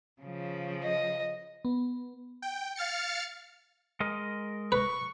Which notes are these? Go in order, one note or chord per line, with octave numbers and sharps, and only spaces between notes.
C#3 F3
D#5
B3
G5
F5 F6 A6 C#7
G#3 A#4 D#5
B4 C#6